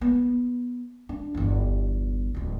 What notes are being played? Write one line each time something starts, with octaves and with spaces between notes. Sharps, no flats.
B3
D4
G1 E2
D1 C#2